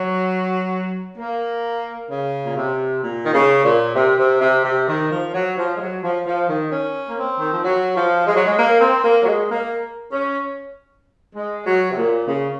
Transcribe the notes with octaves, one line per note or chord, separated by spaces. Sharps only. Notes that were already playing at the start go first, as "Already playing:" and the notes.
Already playing: F#3
A#3
C#3
A#2
C3
A#2
D#3
C#3
A#2
C3
C3
C3
C3
D#3
F3
F#3
F3
G#3
F#3
F3
F3
D#3
C#4
A#3
C4
D#3
F3
F#3
F3
G#3
F#3
G#3
A#3
C4
A#3
F#3
G#3
A#3
C#4
G#3
F#3
C3
A#2
C#3